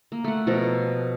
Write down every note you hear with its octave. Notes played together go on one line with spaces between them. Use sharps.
A#3
A3 F#5
B2 F3 A4 A#4